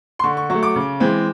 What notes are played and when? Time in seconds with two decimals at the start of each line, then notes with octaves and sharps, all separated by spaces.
0.19 C6
0.24 D3 C#6
0.37 C#6
0.50 F#3 C#6
0.54 A3
0.63 D6
0.76 C#3
1.00 E3 G#3 C4